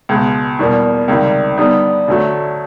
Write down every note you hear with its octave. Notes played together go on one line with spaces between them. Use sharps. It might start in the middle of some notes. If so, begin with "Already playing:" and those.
C#2 B2 G#3
E2 B2 G3 A#3
C#2 C3 D#3 G3
D3 G3 B3 D#4
D2 D3 F#3 A3